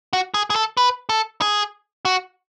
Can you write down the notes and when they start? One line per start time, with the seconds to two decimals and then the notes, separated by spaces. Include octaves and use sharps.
0.13 F#4
0.34 G#4
0.50 G#4
0.56 A4
0.77 B4
1.09 A4
1.42 G#4
2.05 F#4